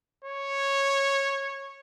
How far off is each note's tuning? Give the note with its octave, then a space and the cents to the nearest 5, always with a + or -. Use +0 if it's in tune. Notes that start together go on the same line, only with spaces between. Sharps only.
C#5 -10